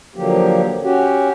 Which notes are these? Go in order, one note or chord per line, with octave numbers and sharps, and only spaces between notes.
D3 F3 F#3 A#3 G4
C#4 F#4 G4